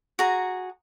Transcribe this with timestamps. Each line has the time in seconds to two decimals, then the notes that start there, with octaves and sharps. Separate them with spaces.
0.19 F#4 G#4 A#5